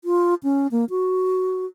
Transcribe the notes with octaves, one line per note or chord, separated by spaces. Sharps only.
F4
C#4
A#3
F#4